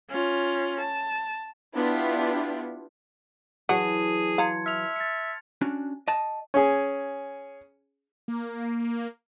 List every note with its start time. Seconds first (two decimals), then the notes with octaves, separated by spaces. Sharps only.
0.11 C#4 F4
0.79 A5
1.73 B3 D4 E4 F4 G4
3.69 E3 F#3 F#4 G#4 A5
4.38 F5 A#5 C6 G#6 C#7
4.66 E5 F6 F7
4.96 A6 C#7
5.61 C#4 D4 F#4
6.08 D#5 A5
6.54 C#4 G#4
8.28 A#3